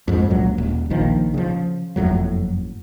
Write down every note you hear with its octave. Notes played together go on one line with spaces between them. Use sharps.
F2 G#2
C#2 A#2 F#3
D#1
A#1 D#3 F3
C#3 F3
F#1 F2 A2 F#3